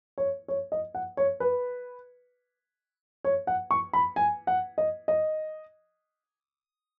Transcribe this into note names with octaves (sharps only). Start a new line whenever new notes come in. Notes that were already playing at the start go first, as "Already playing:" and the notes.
C#5
C#5
D#5
F#5
C#5
B4
C#5
F#5
C#6
B5
G#5
F#5
D#5
D#5